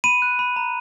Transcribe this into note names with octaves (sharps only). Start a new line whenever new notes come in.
B5 D#7
F#6
B5
A#5